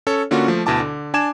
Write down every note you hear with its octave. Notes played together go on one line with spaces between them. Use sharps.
C#4 A4 C#5
D3 A#3 C#4 F4 F#4 C#6
F3 A3
D2 B2 E4 A5 D6
D3
D4 G#5 A5 D6 G#6 E7